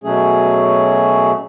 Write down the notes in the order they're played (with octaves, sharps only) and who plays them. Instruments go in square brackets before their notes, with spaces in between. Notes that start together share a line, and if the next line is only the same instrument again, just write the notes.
[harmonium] B2 F#3 A3 C#4 G#4